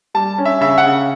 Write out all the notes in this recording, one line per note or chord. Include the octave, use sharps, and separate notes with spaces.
G3 A5
C#4
E5
C#3 E5
F#5
C#3